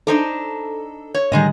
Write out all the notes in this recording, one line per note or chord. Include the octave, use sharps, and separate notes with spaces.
D4 D#4 A4 C5
C#5
A2 D3 D#3 G3 G#3 D#5